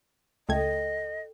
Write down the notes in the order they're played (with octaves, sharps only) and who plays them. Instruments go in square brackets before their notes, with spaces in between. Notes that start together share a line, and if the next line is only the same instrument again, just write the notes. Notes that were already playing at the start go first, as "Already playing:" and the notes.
[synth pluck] C#2 A3 G#6 [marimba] A4 G5 [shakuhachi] D#5